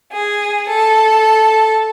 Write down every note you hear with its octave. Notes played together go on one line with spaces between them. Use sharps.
G#4
A4